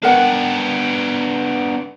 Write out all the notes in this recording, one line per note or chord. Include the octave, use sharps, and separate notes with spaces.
B3 D4 A#4 F#5 G5